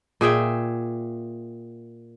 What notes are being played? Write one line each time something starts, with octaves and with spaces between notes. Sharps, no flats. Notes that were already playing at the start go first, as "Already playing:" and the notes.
A#2 G#4 E5 G5